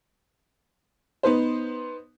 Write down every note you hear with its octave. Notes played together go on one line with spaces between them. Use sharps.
B3 D#4 B4 C5